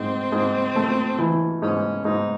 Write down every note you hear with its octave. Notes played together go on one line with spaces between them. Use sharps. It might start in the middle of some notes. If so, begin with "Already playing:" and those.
Already playing: G#2 C4
G#2
A3
E3
G#2 C#4
G#2 D#4